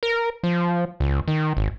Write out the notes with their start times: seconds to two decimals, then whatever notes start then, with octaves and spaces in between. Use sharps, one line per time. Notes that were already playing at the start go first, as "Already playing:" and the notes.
0.03 A#4
0.43 F3
1.00 C#2
1.28 D#3
1.57 G#1